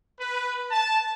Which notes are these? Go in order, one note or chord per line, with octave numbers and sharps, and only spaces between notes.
B4
A5